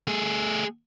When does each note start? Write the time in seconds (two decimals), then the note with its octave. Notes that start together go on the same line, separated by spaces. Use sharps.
0.07 A3 G#4